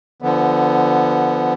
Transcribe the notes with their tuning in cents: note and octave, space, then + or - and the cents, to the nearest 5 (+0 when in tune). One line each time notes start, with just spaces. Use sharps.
D3 +5 F3 -20 B3 +0